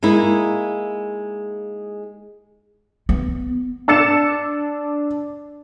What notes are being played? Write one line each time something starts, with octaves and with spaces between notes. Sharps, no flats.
G#3 A#3 D#4 E4
B3
D4 E6 A6 C#7 E7